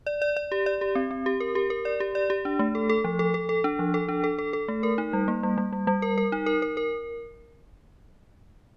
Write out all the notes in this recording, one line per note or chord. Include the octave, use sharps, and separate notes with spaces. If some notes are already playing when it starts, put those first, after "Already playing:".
D5
D5
D5
G4
D5
G4
C4
C4
G4
A#4
G4
A#4
D5
G4
D5
G4
D4
A3
A4
A4
F3
A4
A4
A4
D4
F3
A4
D4
A4
A4
A4
A3
A#4
D#4
G3
A#3
G3
G3
G3
G3
A#4
A#4
D#4
A#4
A#4
A#4